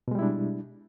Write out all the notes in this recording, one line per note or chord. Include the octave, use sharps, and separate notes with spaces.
B2 G3 G#3 D4 E4